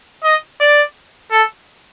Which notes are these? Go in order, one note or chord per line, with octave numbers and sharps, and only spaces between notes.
D#5
D5
A4